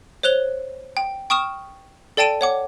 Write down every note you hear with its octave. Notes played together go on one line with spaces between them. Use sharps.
C5 C#5 F#6 F7 G7
G5
G5 C#6 D#6 F6 E7
A4 D5 G5 A5 D7 D#7
C#5 F#5 D6